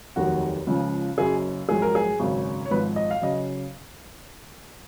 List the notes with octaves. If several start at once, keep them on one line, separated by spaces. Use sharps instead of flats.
F1 D#2 D#3 F#3 F#4
C#2 C#3 F3
F#1 F#2 C#3 G#4
A#1 G#2 F#3 G#4
A#4
G#4
G#1 F#2 C#3
C#5
G#1 G#2 F3 B4
D#5
F5
C#3 F#3 D#5